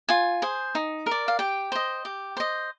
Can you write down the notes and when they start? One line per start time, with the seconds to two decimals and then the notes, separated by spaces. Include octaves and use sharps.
0.09 F4 G#5
0.42 G#4 C5
0.75 D#4
1.06 A#4 D5
1.28 F5
1.39 G4 G5
1.72 C5 D#5
2.05 G4
2.37 C5 D#5